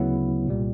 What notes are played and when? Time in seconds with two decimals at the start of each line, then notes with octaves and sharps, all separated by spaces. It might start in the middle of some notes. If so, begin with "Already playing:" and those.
Already playing: D2 C#3 F#3 B3 E4
0.47 C2 A#2 G3